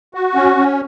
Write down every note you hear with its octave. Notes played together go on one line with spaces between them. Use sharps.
F#4
C#4
C#4